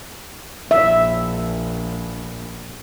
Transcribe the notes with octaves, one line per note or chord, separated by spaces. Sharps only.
A#1 E5